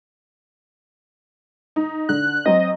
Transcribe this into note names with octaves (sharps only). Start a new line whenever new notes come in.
D#4
D3 F#6
F#3 C4 D#5